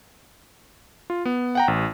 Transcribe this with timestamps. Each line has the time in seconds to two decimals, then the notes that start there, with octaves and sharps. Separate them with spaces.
1.10 F4
1.25 B3
1.55 F#5 G5 A#5
1.68 A1